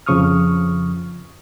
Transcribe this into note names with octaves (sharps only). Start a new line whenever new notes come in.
F2 C#3 F3 C#6 D#6 F6